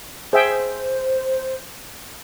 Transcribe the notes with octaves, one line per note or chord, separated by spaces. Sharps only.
G#4 C5 E5 G5